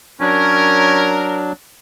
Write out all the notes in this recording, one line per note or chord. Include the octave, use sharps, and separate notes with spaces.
F#3 C#4 D4 A#4